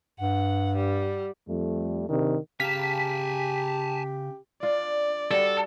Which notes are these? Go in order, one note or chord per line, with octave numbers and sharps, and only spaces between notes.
G2 F#5
G3
F2 G3 A3
C3 D#3 D4
C#3 G4 F5 G#5 A5 B6
D4 F4 D5
G3 D4 F#4 A4